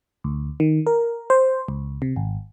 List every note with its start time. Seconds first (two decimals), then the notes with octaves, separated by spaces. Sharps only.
0.24 D2
0.60 D#3
0.87 A#4
1.30 C5
1.68 C#2
2.02 C3
2.16 G#1